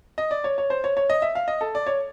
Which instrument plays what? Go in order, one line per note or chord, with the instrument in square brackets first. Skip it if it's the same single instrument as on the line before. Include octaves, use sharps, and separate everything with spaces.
[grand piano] D#5
D5
C#5
C#5
C5
C#5
C#5
D#5
E5
F5
D#5
A4
D5
C#5